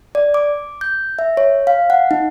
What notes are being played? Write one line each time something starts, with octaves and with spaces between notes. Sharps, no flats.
D5
D6
G6
E5
C#5
F5
F#5
D#4